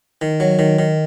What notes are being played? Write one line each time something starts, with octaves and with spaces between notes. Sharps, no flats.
D#3
F#3
D#3
D#3